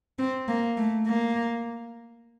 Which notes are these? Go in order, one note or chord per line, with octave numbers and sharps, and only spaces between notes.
C4
A#3
A3
A#3